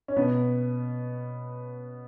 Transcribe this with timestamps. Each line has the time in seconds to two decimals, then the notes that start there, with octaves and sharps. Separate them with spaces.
0.08 C#4
0.16 B2 B3